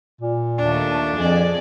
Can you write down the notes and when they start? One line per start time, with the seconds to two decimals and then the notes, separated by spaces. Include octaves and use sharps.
0.21 A#2
0.59 D#2 A3 D4
1.16 F2 F3 G#4 D5